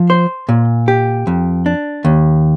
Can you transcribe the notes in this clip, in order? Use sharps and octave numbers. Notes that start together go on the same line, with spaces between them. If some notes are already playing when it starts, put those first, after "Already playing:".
Already playing: F3
C5
A#2
G4
F2
D4
D#2